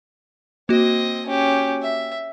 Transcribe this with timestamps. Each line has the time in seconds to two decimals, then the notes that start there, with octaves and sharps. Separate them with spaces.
0.69 A#3 C4 F#4 D#5
1.26 C#4 G4
1.82 E5